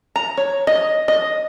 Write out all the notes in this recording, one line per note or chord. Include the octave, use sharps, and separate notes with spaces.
A#5
C#5
D#5
D#5